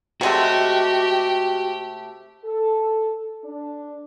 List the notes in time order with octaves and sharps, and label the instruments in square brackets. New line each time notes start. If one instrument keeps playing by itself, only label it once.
[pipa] C3 G#3 A3 [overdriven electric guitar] F#4 F#5 [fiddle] G4
[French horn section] A4
D4